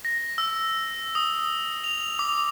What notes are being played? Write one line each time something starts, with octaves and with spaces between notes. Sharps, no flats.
A#6
E6
D#6
F7
D6